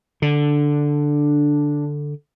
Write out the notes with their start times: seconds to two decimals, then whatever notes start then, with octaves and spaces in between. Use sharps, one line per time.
0.22 D3 D4